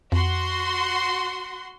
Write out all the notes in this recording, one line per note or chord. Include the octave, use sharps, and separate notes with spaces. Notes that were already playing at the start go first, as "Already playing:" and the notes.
F2 F#4 C6